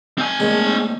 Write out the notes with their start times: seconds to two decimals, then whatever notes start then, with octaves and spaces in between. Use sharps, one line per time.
0.18 C4 G#5
0.40 A#1 A2 G#3